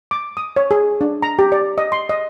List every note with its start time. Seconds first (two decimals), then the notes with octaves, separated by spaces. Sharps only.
0.11 D6
0.37 D#6
0.56 C#5
0.71 G#4
1.01 D4
1.22 A#5
1.39 G4
1.52 D5
1.78 D#5
1.92 C6
2.09 D#5